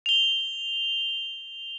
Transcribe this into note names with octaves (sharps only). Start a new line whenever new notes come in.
F7 G7